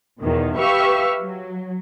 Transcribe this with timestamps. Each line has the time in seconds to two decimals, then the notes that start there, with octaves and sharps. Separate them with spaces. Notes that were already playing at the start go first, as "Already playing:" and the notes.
0.21 E2 B2 D#3
0.57 G4 B4 E5 F5 C#6
1.19 F#3